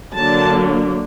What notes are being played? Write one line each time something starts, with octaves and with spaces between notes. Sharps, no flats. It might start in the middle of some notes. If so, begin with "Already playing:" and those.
D3 F#3 A#3 D4 A5